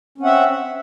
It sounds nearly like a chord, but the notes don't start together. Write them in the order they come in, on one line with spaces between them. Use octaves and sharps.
C#4 C4 F#5 E5